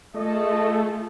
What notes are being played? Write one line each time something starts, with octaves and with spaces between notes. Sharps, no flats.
A3 F4 G#4 A4 D#5